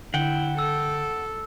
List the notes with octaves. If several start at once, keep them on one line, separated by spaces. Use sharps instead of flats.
D3 E4 F#5 G5
A4 E6